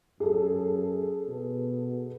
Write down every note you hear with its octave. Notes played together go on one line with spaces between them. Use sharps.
F#2 G#4 A4
B2